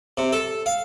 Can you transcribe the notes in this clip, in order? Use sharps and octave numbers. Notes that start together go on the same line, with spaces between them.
C3
A4
F5